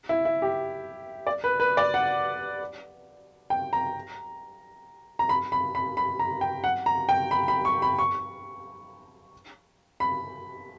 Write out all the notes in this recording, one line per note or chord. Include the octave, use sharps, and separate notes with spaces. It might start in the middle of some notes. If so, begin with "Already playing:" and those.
E4
E4
G4
D5
B4
B4
D5
F#5
G5
A#5
A#5
B5
B5
B5
B5
A#5
G5
F#5
A#5
G5
B5
B5
C#6
B5
C#6
B5